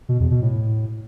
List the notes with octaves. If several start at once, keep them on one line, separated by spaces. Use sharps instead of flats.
B2
E2
B2
A2